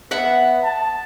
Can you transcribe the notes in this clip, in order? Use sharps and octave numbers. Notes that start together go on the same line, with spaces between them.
B3 E5 F#5
A5